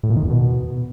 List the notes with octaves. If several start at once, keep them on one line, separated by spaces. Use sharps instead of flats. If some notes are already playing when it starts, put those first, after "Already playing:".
A2
A#2
D#3
E2
B2